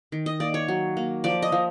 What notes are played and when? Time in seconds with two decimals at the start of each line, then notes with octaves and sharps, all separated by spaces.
0.12 D#3
0.26 D#5
0.40 A#3 D5
0.54 C#5
0.68 F#3
0.97 A#3
1.24 F3 D5
1.42 D#5
1.52 F3